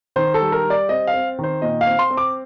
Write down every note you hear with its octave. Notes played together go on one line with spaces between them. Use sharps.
D#3 C5
A4
G3
A#4
G3
D5
C4 D#5
F5
C4
D#3
C5
A#2 D#5
F5
C4
C6
C4
D6